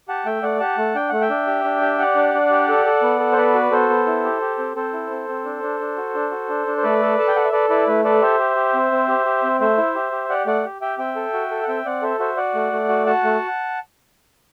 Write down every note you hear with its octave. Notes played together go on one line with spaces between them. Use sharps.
G4 F#5 A5
A3 E5 G5
A3 D5 F#5
G4 F#5 A5
A3
D4 G5
A3 F#5
E5 G5
D4
G4
D4
G4
G4 D5 F#5
D4
D4
G4
A4
A4
B3
A4
C5
B3 B4 D5
F#4
B3 A4 C5
B3
E4
G4
G4
C4
C4 A4 C5
E4
C4
C4
D4
D4
D4
F#4
D4
F#4
D4
D4
C5
A3 B4 D5
A4
A4 A5
G5
A4 F#5
E5
A4 B4 D5
E4 B4 D5
A3 B4
A4 B4 D5
G4 C5 E5
G4
G4
C4
C4
G4
G4
C4
A3 C5 E5
E4
G4
G4
G4 D5 F#5
A3 D5 F#5
G4
G4 E5 G5
C4 E5 G5
A4
F#4
A4
F#5
C4 E5 G5
C4 D5 F#5
A4 C5 E5
F#4 C5 E5
F#4 D5 F#5
A3
A3
F#4
F#4 F#5 A5
A3